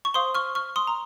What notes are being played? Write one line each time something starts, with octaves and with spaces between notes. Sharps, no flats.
C#6
C5 F5 C6 D#6
C#6 F6
C#6 F6
C6 D#6
A#5